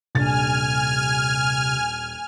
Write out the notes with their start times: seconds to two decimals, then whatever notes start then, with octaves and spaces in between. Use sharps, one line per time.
0.15 D#1 C3 D4 G#5 F6 A6